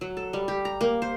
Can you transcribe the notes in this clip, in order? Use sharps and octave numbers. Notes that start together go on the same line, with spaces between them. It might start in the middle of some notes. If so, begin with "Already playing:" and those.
F#3
A4
G3
G4
A#5
A#3
C5